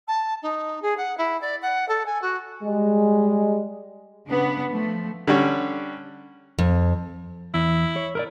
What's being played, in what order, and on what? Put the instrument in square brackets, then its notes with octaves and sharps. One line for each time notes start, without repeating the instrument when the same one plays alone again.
[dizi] A5
D#4
G#4
F#5
E4
D5
F#5
A4
G#5
F#4
[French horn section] G3 G#3
[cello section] C#3 B3 D4
F3 A3
[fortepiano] D3 G3 C#4
[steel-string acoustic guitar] F2
[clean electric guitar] E2 [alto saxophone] E4
[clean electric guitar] C#5
A#4 B4 D5